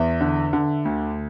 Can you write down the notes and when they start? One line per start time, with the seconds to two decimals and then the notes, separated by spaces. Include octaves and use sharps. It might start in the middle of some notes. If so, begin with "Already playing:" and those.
Already playing: E2 E5
0.21 D3
0.53 D3
0.85 D2